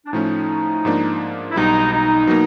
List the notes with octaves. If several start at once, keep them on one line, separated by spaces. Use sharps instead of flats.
D4
A2 F3 A3 C#4 D#4
G#2 F3 A#3 D4
E4
B1 B2 G3 D#4
D#4
B2 F#3 A#3